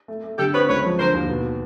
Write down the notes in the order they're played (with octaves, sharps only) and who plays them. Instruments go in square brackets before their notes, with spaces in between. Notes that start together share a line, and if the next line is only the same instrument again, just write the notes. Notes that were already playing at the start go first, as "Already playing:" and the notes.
[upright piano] A3
A3
[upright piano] D3 [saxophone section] G4 A4
[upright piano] C4 [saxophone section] B4 C#5
[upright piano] C#2 [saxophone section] B4 C#5
[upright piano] F3
[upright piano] D3 [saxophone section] A#4 C5
[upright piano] D#2
B2